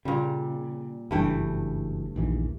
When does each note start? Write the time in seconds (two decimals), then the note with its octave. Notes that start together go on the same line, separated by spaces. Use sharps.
0.05 A#2 C#3 G3
1.11 F#1 G2 E3 A3 G5
2.16 A#1 D#2 E3